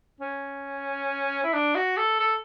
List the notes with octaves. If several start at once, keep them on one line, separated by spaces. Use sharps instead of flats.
C#4
E4
D4
F#4
A4
A4